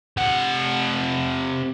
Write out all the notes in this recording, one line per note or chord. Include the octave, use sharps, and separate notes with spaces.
C3 F#5